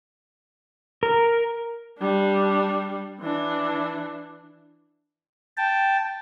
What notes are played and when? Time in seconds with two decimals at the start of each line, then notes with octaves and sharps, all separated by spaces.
1.03 A#4
1.99 G3 D4
3.21 E3 D4
5.57 G5 A5